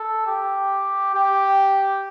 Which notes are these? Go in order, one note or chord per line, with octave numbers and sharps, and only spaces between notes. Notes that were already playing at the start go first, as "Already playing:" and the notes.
Already playing: A4
G4
G4